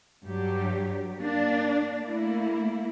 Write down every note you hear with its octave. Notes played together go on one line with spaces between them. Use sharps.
G2 F#3 G4
A#3 D4
A3 A#3 E4